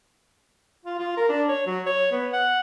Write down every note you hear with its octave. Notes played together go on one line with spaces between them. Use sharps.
F4
F4
A#4
D4
C#5
F#3
C#5
B3
F#5